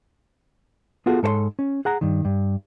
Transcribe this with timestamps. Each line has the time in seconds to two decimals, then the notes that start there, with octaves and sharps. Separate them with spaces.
1.06 B3 F4 F#4 G#4 A4
1.23 G#2 A4 C5 C#5 C6
1.59 C#4
1.85 G#4 F#5 A#5
2.01 G2 D#3
2.25 G2